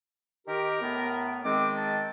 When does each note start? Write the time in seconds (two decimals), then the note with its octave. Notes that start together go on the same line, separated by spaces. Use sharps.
0.47 D#3 G4 A#4
0.82 A2 B3
1.44 D#3 G#3 C4 D6
1.77 A5